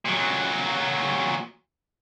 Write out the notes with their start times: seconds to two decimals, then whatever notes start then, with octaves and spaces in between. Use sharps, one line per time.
0.05 A#2 F#3